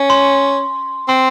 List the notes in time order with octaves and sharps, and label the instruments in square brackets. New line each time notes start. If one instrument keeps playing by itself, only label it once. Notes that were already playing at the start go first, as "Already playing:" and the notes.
Already playing: [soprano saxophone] C#4
[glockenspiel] C6
[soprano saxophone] C4 [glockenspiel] C6